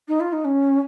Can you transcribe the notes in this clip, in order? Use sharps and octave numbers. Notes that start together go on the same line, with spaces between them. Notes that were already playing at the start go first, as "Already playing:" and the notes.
D#4
F4
D#4
C#4